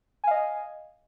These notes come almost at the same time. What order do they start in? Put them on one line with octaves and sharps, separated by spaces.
G#5 F5 D#5